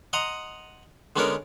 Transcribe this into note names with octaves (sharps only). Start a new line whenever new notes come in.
D#5 F#5 A#5 C6 D#6
D3 G#3 B3 C#4 D4 A#4